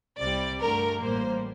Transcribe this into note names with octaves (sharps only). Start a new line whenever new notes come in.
C2 C3 G3 D5
G2 D3 A3 A#4
A1 A2 G3 A#3 C5